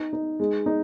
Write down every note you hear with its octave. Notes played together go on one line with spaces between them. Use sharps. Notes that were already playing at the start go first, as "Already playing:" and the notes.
Already playing: D#4
D#4
G#3
D#4